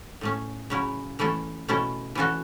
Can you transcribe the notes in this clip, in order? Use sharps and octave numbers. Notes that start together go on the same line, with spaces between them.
A2 A3 C#4
C#3 F#3 C#4 E4
E3 A3 C#4 E4 A4
B2 A3 C#4 E4 A4
E3 C#4 F#4 A4